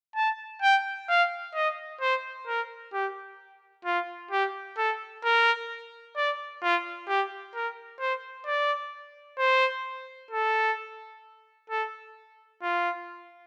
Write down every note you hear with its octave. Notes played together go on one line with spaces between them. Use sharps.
A5
G5
F5
D#5
C5
A#4
G4
F4
G4
A4
A#4
D5
F4
G4
A#4
C5
D5
C5
A4
A4
F4